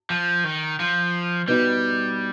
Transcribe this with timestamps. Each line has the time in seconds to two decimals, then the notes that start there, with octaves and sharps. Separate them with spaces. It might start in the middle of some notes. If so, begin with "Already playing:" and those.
0.10 F3
0.44 D#3
0.80 F3
1.47 B2 G3 B3 D#4